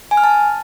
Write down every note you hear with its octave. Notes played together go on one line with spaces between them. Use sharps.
G#5
F6
A5